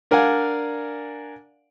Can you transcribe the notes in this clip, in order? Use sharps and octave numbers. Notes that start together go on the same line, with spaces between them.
D4 A#4 D5 F5 F#5 G#5